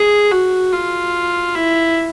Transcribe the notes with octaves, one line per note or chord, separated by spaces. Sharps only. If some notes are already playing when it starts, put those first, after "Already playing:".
Already playing: G#4
F#4
F4
E4